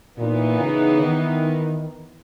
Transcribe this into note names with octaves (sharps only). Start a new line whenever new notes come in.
A#2 E3 B3 D#4
C#3
D#3